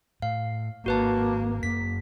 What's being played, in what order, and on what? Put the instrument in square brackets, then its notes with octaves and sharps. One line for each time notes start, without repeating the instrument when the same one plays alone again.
[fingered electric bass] A2 [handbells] F5
[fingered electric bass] G#1 [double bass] A#3 [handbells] F#4 B4 A5
[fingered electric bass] F#2 A#3 [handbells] B6